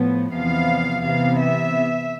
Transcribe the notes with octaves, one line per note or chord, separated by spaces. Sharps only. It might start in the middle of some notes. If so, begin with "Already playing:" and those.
Already playing: A2 F3 B3
E2 C3 F3 B3 F5
C3 E3 B3 F5
E5